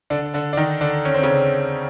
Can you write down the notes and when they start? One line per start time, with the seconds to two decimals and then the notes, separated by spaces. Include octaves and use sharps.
0.10 D3 D4
0.34 D3 D4
0.53 D4
0.57 D#3 D#4
0.81 D3 D4
1.05 C#4
1.14 C4
1.23 C#3 C#4